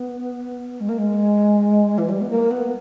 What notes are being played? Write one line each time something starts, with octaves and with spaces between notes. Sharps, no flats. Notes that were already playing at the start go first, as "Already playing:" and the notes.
Already playing: B3
G#3
A#3
G#3
E3
G3
B3
A#3
B3